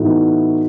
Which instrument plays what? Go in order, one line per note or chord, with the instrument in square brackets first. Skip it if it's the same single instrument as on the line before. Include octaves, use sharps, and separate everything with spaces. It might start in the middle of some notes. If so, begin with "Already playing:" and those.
Already playing: [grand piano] A2 E3 B3 D#4 F#4